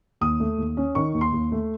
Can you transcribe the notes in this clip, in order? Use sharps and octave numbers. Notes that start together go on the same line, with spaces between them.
D#2 D#6
A3
D#2
C#4
D#3 C#6
D#2
C6
D#2
A3